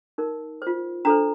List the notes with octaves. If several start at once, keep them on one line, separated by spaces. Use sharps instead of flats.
D#4 A#4
F4 C5
D4 A4 C5 A#5